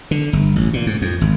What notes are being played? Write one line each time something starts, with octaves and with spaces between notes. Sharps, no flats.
D3
G1
A1
A#2
G#2
F2
G#1